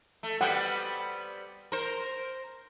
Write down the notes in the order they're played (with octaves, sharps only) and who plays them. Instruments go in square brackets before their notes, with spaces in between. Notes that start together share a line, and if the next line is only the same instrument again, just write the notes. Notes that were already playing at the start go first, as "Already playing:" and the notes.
[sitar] A3
[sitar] G3 B3 C4 [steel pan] F#5 G5
[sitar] A#4 C5